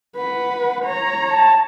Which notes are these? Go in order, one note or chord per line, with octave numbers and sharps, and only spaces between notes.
B4 F#5
C#5 A#5
A5